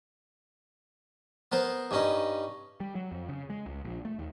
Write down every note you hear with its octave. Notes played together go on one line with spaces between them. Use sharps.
B3 A#4 C5
G2 C#4 D#4
G3
F#3
F2
C#3
G#3
C#2
A#1
A3
D#2